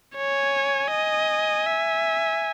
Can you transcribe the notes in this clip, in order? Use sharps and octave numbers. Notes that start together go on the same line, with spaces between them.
C#5 G#5
D#5
E5